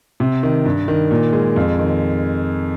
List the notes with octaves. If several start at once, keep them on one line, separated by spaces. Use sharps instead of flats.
C3
D#3
G2
D#3
A#2
G#3
F2
D#3